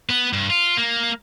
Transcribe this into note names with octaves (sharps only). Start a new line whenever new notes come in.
B3
G2
F4
A#3